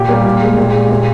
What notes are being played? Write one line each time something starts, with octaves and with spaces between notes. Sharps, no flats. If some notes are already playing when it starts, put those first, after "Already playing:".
Already playing: A#2 G4
G3 A#3
A#2
G#3
A#2 G4
G#3
A#2